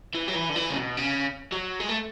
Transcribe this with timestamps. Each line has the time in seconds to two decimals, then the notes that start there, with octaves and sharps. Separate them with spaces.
0.15 E3
0.28 F#3
0.35 E3
0.49 D3
0.56 E3
0.70 C#3
0.76 B2
0.97 C#3
1.52 F#3
1.80 G#3
1.89 A3